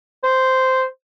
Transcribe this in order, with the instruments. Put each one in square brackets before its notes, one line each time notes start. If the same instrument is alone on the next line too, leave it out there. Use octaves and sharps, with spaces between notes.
[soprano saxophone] C5